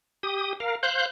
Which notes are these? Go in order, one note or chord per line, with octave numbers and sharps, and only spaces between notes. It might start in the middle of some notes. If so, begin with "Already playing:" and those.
G4 D#6
A#4 F5
C5 F5 F#6 G6